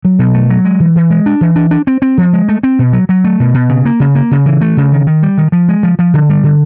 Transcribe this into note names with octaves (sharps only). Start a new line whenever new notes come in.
F#3
B2
A3
F#3
G#3
E3
E3
G#3
D4
E3
D4
D4
C4
C4
F3
G#3
A3
C4
B2
F#3
F#3
A3
B2
B2
C#3
A#3
C#3
A#3
C#3
E3
A3
C#3
D#3
D#3
G3
D#3
F3
G#3
F3
F3
D3
G3
D3